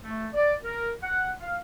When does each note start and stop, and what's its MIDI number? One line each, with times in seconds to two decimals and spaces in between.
0.04 0.27 57
0.34 0.53 74
0.63 0.91 70
1.02 1.30 78
1.40 1.57 77